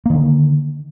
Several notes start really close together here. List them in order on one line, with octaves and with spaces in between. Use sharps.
A#3 D#3 D3